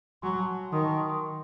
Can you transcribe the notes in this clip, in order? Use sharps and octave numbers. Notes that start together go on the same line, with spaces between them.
F#3 G#5 C6
F#5 A5
D#3 C6 D#6
A5 C#6
C6 D#6
C6 D#6